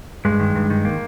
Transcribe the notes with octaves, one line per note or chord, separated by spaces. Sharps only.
G2 G#3
D#3
G2
D#3
A#3